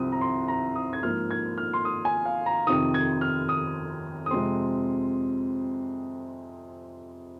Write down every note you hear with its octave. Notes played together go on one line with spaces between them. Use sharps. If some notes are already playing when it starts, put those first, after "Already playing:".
Already playing: C2 C3 F3 C4 D#6
A#5
C6
A#5
D#6
G#6
G#2 F3 A#3 F6
G#6
F6
C6
D#6
G#5
F5
A#5
F2 C3 D#3 D#6
G#6
F6
D#6
D#6
F2 C3 G#3 C4 C6